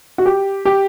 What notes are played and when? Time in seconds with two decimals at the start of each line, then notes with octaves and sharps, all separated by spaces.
0.18 F#4
0.26 G4
0.65 G4